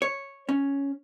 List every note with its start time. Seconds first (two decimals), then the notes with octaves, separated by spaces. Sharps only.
0.02 C#5
0.49 C#4